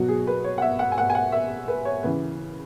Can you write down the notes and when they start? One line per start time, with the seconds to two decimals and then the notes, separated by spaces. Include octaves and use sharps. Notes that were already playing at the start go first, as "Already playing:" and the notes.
Already playing: B2 F#3 F#4
0.08 G#4
0.27 B4
0.44 C#5
0.58 F#5
0.62 E5
0.79 F#5
0.92 G#5
0.98 F#5
1.10 G#5
1.15 F#5
1.32 E5
1.68 B4
1.85 C#5
2.03 C#3 E3 B4